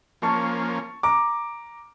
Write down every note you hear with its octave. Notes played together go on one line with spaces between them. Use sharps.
F3 A#3 C#4 A5 C#6
A#5 D6